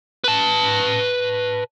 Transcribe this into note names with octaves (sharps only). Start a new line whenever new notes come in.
B4 A5